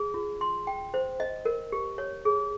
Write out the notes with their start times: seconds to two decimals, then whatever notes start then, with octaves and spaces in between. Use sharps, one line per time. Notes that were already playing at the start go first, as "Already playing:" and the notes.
Already playing: G#4
0.14 F4
0.41 C6
0.67 G5
0.94 C5
1.20 D#5
1.45 A#4
1.72 G4
1.98 C#5
2.25 G#4